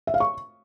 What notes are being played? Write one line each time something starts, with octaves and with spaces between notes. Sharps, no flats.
E5
F5
C#6